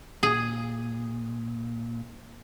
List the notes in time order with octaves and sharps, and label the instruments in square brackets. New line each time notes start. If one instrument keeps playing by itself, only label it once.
[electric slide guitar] A#2 [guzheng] G#4